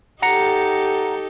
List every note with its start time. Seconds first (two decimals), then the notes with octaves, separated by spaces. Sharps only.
0.22 D#4 G4 A4 F#5 A#5 C#7